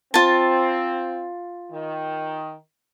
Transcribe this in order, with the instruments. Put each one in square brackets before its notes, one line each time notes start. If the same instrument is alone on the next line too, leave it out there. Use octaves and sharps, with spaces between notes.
[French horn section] C4 [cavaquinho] F4 A5
[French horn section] D#3